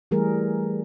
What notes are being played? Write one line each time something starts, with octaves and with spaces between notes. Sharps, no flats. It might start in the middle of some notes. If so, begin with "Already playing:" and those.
E3 G3 A3 G#4 A#4